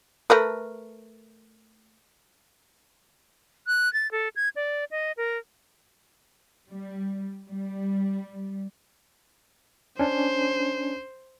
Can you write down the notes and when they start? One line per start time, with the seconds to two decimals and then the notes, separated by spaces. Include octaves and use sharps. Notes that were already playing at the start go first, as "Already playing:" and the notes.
0.30 A3 A#4 B4
3.67 F#6
3.93 A6
4.12 A4
4.36 G#6
4.56 D5
4.91 D#5
5.17 A#4
6.69 G3
7.49 G3
9.99 C#4 D4 C5